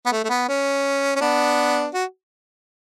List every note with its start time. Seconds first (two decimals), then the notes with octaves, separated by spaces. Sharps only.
0.06 B3
0.12 A3
0.24 A3
0.30 B3
0.49 C#4
1.16 C#4
1.21 B3 D4
1.94 F#4